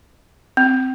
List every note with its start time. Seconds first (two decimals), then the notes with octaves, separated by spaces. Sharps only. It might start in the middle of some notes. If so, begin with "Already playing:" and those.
0.57 C4